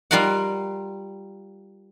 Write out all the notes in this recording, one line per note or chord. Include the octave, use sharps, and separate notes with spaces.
G3 F4 A#4 F5 F#5